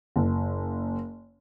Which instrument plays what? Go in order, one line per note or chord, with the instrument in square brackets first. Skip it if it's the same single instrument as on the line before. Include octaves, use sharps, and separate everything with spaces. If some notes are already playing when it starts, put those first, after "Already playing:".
[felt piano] F#1